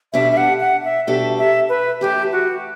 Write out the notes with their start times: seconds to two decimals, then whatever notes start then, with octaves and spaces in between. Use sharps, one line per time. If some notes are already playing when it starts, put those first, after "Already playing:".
0.13 B2 G3 D4 A4 E5
0.32 E5
0.37 F#5
0.60 F#5
0.84 E5
1.07 B2 G3 D4 A4 E5
1.38 E5
1.69 B4
2.01 F#2 E3 A3 G4
2.32 F#4